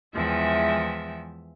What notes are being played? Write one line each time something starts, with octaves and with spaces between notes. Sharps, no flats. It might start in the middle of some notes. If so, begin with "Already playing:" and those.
E2 E3 F3 G#3 G4 E5